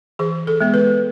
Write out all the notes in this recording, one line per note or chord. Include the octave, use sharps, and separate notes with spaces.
E3 G#4
A4
G#3 B3
B4